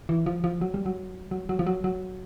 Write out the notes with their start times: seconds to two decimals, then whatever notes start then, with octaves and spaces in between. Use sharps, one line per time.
0.09 E3
0.26 F3
0.44 F3
0.61 F#3
0.74 G3
0.86 F#3
1.31 F#3
1.49 F#3
1.59 F3
1.67 F#3
1.84 F#3